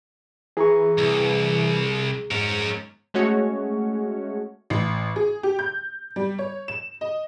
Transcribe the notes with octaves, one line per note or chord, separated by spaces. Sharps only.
E3 G#4 A#5 C#6
C2
G#2 C#4 A#4
G#3 A3 C#4 F#4 C#5
A1
G#4
G4
G6
G3
C#5
E7
D#5